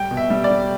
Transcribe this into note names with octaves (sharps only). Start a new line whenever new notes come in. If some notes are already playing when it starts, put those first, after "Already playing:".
Already playing: G3 G5
B2
E5
G3
D5
G3